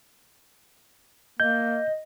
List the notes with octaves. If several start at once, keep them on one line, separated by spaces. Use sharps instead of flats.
A#3 D#5 G6